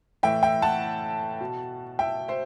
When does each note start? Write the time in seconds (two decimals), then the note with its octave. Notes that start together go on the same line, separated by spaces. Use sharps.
0.23 A2 E3 E5 G5
0.43 E5 G5
0.62 F#5 A5
1.41 B2
1.99 E5 G5
2.28 C5 E5